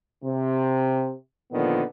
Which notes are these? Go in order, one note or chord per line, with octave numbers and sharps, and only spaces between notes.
C3
A#2 D3 D#3 F3 B3